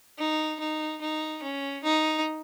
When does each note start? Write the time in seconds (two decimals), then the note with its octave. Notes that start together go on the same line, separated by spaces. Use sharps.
0.19 D#4
0.59 D#4
1.01 D#4
1.42 C#4
1.84 D#4